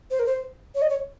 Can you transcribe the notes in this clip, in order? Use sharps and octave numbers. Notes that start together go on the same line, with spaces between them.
C5
A#4
C5
C#5
D#5
C#5